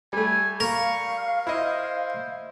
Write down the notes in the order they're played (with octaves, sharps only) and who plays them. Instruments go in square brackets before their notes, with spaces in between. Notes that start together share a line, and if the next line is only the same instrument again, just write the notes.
[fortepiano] G3 A3 [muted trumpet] G#5
[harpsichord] A#4 [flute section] F5 [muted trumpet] C#6
[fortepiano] E4 D#5 [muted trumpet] C5